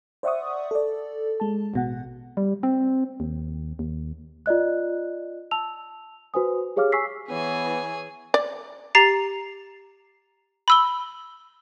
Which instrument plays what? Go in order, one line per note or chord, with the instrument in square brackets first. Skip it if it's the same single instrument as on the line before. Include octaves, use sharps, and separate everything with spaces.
[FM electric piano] C5 D5 E5 F#5 C#6 D#6
A4 D5
G#3 A5
A1 B2 F#5
[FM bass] G3
C4
D#2
D#2
[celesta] F4 D5 D#5 F#6
A5 E6 F7
F#4 B4 C5 G#5 D#6
G4 G#4 C#5 F5 D6 F6
G#5 C#6 E6 B6 C7
[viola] E3 [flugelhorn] B3 [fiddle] G#4 G#5 [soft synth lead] C#5
[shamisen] D5
[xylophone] G4 A#5 A6 C7 F7
B5 E6 G7